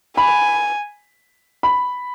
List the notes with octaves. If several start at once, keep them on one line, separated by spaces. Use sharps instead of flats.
G#5 B5
B5